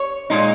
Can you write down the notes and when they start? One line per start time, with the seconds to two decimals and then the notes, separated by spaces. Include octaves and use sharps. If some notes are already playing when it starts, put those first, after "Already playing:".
Already playing: C#5
0.30 A#2 G#3 D#4